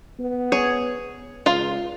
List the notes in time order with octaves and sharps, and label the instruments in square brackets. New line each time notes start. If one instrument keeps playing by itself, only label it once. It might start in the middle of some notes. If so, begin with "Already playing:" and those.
[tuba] B3
[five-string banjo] G#4 C#5
[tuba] C#2 [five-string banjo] F4 F5